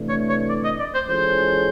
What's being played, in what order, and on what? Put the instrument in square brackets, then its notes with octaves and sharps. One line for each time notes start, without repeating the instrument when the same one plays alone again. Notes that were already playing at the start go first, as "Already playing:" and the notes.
Already playing: [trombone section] C3 E3 A3 D4
[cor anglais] C#5
C#5
D5
D#5
D5
C5
[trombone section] E3 G#3 C#4 F4 A4 [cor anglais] C5